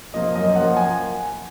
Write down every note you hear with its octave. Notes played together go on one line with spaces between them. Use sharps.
F3 A#3 D#5
F#2 D#5
F3 A#3 F#5
G#5